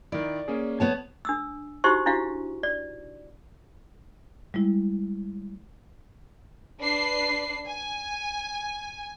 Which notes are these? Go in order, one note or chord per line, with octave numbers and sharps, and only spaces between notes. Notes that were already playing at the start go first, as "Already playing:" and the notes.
D#3 E4 D5
A#3 C#4 G#4
B3 C#5 A5
D4 D#6 E6
D#4 E4 F#4 G4 C5 C#6
D4 E4 F#4 F5
D5
G3 G#3 E4
D4 B4 C7
G#5